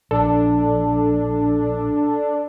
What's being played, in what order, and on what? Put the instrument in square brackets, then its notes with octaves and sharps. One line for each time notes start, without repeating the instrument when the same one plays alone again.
[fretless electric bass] A#1 [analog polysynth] D4 [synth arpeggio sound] A4